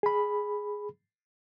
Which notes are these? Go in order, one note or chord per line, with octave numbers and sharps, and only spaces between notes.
G#4 B5